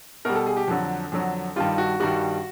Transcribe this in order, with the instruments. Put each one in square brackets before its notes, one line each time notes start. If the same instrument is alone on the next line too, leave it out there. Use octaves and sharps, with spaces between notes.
[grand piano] B2 G3 A#4
A4
G#4
G4
F2 D3 F#3
F2 D3 F#3
G2 D#3 G3 F4
F#4
G2 D#3 G3 F#4